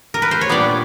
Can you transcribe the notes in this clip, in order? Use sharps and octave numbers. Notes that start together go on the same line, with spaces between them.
A#4
B4
C5
C#5
A#2 G3 B3 D4 D5